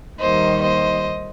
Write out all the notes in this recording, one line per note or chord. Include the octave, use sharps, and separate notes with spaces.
D#2 D#3 G3 A#3 C5 D#5
C5 D#5